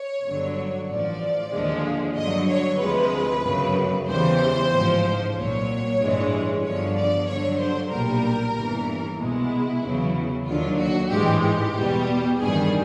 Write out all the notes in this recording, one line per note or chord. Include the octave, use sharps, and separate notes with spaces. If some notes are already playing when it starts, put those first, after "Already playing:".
Already playing: C#5
G1 G2 D3 F#3
A1 A2 F3 D5
D#2 D3 F3 G#3
G2 D3 F#3 D#5
C#5
D2 C3 F3 G#3 B4
G1 F#2 C#3
E2 C#3 E3 G3 C5
A1 G#2 F3
C2 A#2 F#3 C#5
A1 G2 E3 G#3
G1 G2 D3 F3 C#5
D5
G2 D3 F#3 C#5
C5
B1 A#2 G3 A#4
G1 G2 E3
C2 B2 G#3 E4
E2 C#3 F#3
D#2 D3 F#3 F4
F#4
A1 G#2 E3 G#3 G4
G4
E2 B2 G3
A1 G2 D#3 G3 G#4